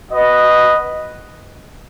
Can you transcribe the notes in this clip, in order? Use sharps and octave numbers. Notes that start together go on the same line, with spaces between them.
B3 F#4 B4 D#5